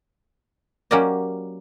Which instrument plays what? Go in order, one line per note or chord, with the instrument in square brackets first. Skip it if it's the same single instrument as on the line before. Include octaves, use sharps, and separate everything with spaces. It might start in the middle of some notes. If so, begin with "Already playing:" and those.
[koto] F#3 A#3 C#4 G4 D5 D#5